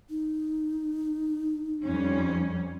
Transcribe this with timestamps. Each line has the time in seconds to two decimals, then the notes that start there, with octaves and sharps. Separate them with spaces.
0.10 D#4
1.83 F2 G3 C#4